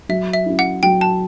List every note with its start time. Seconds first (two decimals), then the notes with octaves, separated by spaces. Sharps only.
0.09 F#3 E5
0.34 E5
0.46 C#4 E4
0.59 F#5
0.83 F#3 G5
1.01 A5